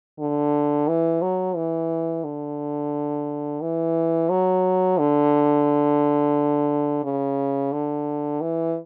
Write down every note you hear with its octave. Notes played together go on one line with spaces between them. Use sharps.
D3
E3
F#3
E3
D3
E3
F#3
D3
C#3
D3
E3